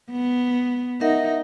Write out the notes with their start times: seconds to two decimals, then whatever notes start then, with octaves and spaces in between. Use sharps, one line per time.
0.11 B3
1.01 D#4 A#4 E5 F#5